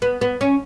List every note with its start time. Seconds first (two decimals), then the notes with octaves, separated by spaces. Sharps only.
0.02 B3
0.21 B3
0.41 C#4